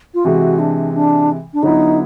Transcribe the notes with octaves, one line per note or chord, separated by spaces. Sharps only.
F4
C3 E3 G#3 F#4
D4
D4
D4
D3 F#3 B3 D#4 E4